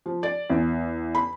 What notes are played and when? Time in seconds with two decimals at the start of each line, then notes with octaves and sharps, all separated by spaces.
0.06 F3
0.23 D5
0.50 E2
1.15 B5